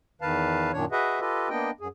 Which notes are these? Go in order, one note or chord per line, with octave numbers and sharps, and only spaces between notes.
E2 D#3 B4 F5 A5
F#2 A#2 D#3 D4 C#5
F#4 G#4 B4 D#5 E5 F#5
F4 G4 A4 B4 D#5
A#3 B3 D4 D#5 G5
F#2 G#4